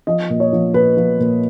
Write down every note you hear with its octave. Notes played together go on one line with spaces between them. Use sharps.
F3 D#5
A#2
C#5
F3
A#2 B4
F3
A#2